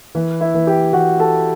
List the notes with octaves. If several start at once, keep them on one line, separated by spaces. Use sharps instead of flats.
E3 B4
E4 E5
E3
G4 G5
E3 F#4 F#5
A4 A5